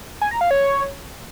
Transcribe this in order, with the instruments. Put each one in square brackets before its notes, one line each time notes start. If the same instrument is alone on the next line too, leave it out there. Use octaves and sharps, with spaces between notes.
[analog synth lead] G#5
A#5
F5
C#5